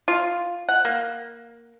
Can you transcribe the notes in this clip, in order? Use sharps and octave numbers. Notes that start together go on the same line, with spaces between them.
F4
F#5
A#3